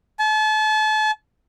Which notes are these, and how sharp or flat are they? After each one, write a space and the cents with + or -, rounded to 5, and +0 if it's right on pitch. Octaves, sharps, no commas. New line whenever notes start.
A5 -35